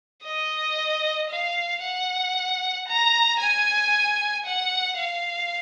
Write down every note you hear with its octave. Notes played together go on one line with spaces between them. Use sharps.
D#5
F5
F#5
A#5
G#5
F#5
F5